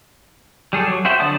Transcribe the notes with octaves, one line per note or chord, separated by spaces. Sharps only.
G3 G#4 A4
F#3
F#4 C5 E5 G5
D3 F#3 D5 A5 D#6